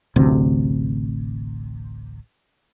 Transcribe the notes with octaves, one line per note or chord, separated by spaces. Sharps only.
D1 A1 D2 C3